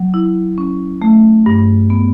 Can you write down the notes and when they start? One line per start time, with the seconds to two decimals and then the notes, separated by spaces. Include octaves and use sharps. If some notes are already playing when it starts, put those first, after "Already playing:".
Already playing: F#3
0.14 E4
0.58 C#4
1.02 A3
1.46 G2
1.90 B3